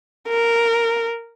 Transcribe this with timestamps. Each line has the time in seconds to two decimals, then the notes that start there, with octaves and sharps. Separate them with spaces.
0.28 A#4